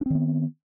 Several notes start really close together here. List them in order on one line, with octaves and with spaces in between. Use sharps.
D4 C4 D#3 B3